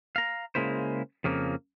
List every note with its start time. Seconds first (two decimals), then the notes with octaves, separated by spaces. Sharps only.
0.16 F5 A#5
0.55 C#3 G#3 A#3 E4 C5
1.24 F2 C#3 F3 A#3